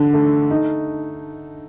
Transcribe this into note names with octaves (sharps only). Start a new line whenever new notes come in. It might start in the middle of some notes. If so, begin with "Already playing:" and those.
Already playing: D3
A3
D#4